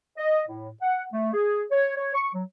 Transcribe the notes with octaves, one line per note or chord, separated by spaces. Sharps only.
D#5
A2
F#5
A3
G#4
C#5
C#5
C#6
F#3